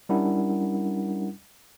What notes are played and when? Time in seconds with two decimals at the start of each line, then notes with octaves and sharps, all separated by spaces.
0.09 G3 C#4 D4 E4 A#4 F#5